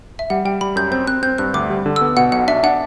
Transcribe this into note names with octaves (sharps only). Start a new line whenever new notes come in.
E5
G3 F#5
G3 G5
G3 B5
F#2 G6
C4 G6
C4 F#6
C4 G6
G2 F#6
D2 D6
G3
D3
E6
B3
B2 F#5
B1 F#5
D4 E5
D4 F#5